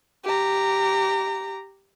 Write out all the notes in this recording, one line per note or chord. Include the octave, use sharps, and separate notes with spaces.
G4 A#5